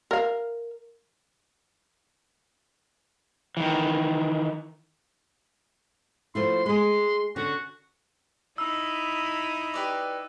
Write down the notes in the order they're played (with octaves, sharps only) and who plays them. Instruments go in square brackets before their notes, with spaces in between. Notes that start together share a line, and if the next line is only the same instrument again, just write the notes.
[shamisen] A#4 F5
[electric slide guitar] D#3 E3
[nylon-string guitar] F3 A3 E4 [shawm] C6
[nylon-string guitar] G#3 G#4 [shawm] C6
[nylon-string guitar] D3 C#4 [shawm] F#4
[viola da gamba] D#4 E4 [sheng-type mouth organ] A#5 B5 D#6 [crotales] E6
[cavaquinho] G4 B4 D5